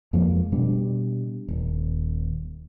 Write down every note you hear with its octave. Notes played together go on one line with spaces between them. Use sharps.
F2 F3 G#3 A#3
B2 G3 D4
D#1